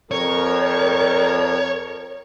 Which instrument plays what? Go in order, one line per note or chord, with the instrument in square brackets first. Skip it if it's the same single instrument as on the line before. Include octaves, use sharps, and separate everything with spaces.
[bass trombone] F2 [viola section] A#4 [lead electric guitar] C#5